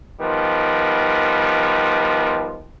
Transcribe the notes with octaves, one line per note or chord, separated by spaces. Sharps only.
D#3 F3 G3 B3